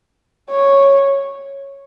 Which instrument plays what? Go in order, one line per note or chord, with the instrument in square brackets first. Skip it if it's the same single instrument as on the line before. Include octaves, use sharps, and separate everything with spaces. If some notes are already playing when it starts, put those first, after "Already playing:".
[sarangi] C#5